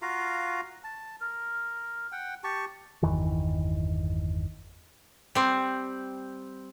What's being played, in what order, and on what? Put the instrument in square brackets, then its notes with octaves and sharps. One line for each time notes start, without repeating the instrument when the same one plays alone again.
[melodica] F4 F#4 F5 A#5
A5
A#4
F#5 G5
G4 A5 C#6
[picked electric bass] G1 E2 D#3 E3
[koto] G3 C4